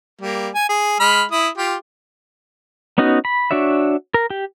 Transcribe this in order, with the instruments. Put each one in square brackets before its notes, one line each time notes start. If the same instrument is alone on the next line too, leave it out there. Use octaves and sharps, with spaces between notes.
[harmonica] G3 A#3
G#5
G#4
G#3 B5 F6
E4 D#6
F4 G4
[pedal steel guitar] B3 C#4 D#4 F#4
B5
D4 F#4 C#5 E5
A#4
G4